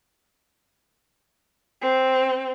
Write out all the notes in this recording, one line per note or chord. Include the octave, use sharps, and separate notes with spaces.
C4